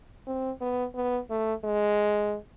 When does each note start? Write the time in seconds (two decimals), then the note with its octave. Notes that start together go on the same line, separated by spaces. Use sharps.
0.27 C4
0.61 B3
0.95 B3
1.30 A3
1.64 G#3